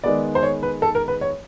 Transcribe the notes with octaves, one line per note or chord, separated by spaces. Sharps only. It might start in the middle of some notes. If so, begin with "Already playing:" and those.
D#3 G#3 B3 D5
C5
C#5
B4
A4
A#4
B4
C#5